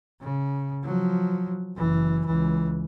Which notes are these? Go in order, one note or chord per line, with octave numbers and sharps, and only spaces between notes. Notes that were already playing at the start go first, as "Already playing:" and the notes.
C#3
F3 F#3
F#1 E3
C#2 E3